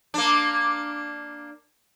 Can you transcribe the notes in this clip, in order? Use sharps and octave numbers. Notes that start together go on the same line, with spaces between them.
A#3 D4